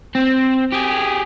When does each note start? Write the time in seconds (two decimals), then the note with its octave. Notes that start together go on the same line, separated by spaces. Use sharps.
0.15 C4
0.72 G4 G#4